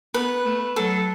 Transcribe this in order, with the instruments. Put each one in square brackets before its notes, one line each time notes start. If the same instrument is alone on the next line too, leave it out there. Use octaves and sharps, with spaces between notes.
[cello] B3 [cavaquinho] B4
[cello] A3
[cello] F#3 [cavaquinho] A4